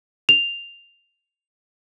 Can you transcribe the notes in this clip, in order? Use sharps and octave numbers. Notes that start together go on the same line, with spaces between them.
F7